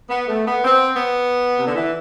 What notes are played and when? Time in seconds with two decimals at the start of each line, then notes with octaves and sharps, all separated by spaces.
0.09 B3
0.27 A3
0.46 B3
0.64 C4
0.92 B3
1.57 C3
1.66 D3
1.75 E3